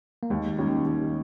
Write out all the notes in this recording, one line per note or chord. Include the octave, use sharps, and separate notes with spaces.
A#3
D#2 G#3
D#3 G3 C#4
D#2